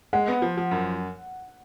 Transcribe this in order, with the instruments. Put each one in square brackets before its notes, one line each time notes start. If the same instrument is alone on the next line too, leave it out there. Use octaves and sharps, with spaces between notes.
[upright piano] G#3 [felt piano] F#5
[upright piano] B3
F3
F3
F#2